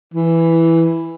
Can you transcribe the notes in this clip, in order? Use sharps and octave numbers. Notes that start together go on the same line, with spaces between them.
E3